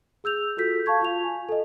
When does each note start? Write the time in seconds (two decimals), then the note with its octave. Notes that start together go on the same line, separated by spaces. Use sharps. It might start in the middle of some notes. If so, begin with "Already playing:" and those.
0.24 G#4 E6 G6 F7
0.57 F4 F#4 A4 G6 B6
0.86 F5 A5 C#6 G#6
1.02 F4 F7
1.24 G#5
1.49 A4 D#5